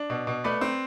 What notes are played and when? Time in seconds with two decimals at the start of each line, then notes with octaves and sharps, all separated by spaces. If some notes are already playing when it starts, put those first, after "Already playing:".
Already playing: D4
0.10 B2
0.27 B2
0.44 A3 B4 D5
0.61 C4